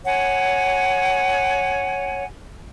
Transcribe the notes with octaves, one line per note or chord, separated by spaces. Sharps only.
C#5 F#5 G#5